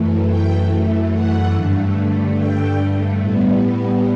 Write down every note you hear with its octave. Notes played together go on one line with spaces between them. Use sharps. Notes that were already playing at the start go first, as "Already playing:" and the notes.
Already playing: F#2 E3 A3
G5
F#5
G2 D3 A3
G5
A2 G3 B3